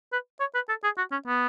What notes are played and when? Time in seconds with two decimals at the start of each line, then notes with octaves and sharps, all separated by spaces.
0.12 B4
0.40 C#5
0.55 B4
0.69 A4
0.84 G#4
0.98 F#4
1.12 C#4
1.27 B3